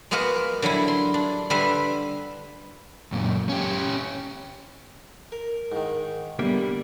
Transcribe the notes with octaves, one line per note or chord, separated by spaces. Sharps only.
G#3 A#3 B3 F#4 A#4 B4
D3 F#3 G3 E4
C6
D4
D3 G3 B4 E5 C6
F#2 A#2
C#4 G4
A#4
G#2 D#3
D3 G3 A#3 B3 G4 E5